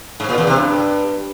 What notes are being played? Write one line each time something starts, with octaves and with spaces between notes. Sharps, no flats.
G#2
A#2
E2
C3
G2